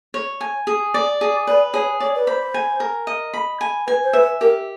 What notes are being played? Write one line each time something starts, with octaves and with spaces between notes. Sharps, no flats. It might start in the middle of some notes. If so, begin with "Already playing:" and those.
C#5
G#5
G#4
D5
G#4
B4 D5
G#4 C#5
C#5 D5
B4
C5 B5
G#5
A#4
D#5
B5
G#5
B4 G#5
C5
B4 E5
G4 A#4